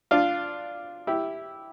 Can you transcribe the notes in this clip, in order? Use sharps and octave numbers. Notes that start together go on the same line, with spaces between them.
D4 F4
E4 G4